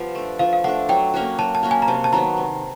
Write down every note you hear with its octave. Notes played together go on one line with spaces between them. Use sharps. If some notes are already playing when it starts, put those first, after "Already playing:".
Already playing: F3 B3 G4
A3 D4
F3 F5
F5
A3 D4 F#5
F#3 G5
A#3 C#4 F#4
F#3 A5
A5
A#3 C#4 F#4
G#5
A#5
C3 A5
A5
D#3 F#3 B3 A#5
C3